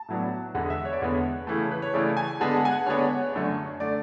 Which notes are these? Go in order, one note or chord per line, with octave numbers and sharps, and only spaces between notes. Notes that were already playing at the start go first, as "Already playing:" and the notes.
Already playing: A5
A2 F#3 B3 D4
E2 D3 G#3 B3 F#5
E5
C#5
D5
E2 D3 G#3 B3 C#5
C#3 E3 A3
B4
C#5
C#3 E3 A3 D5
G#5
D3 G#3 B3 D4 A5
F#5
G#5
F#5
D3 G#3 B3 D4 C#5
C#5
F#2 D3 A3 D4
D3 A3 D4 D5